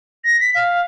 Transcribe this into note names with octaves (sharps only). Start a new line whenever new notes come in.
A#6
B6
F5